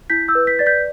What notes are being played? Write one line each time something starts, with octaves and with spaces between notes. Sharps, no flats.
E4 G6 B6
E6 G6
B4
G6 B6
D5 A6
G6 B6